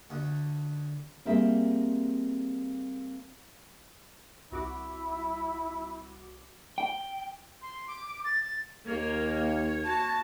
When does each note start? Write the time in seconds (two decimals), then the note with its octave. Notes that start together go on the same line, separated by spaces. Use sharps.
0.10 D2
1.25 G3 A#3 C4 G#4 E5
4.52 C2 E4 F#4 D6
6.78 G5
7.62 C6
7.88 D6
8.24 A6
8.42 A6
8.88 D#2 A#3 C#5
9.85 F#4 A5